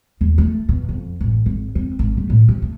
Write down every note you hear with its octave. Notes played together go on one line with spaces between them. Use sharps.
D#2
A3
B2
F2
A1
G#1
C4
G#1
A3
A2
C3
A3